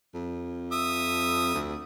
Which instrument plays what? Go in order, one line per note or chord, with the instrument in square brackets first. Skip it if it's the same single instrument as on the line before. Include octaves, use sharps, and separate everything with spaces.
[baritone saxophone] F2
[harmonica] E5 D#6
[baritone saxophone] D2